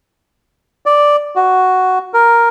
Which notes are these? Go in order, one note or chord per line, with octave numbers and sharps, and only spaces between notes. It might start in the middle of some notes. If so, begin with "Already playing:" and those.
D5
F#4
A#4